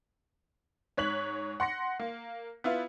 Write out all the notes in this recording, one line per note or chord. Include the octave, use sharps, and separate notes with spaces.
G#2 C#5 F#6 B6 F#7
F#5 C6 A#6 C#7
A#3
B3 E4 F4